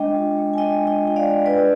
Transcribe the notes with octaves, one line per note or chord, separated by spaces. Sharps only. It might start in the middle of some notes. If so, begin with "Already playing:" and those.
Already playing: G#3 D4 D#5 G5
F4
G#3
G#5
D4 D#5 G5
G#3
D#5 G5
F4
G5
D5 F5
G#3
D4 B4 D5